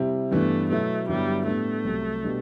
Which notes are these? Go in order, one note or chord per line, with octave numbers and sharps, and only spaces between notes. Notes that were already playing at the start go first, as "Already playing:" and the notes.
Already playing: C3 G3 C4 E4
G2 E3 A3 B3 D4
B2 F#3 A3 B3 E4
G2 D3 F#3 G3 B3 E4
A2 G3 A3 B3 D4
C2 C3 F#3
B2 G3 D4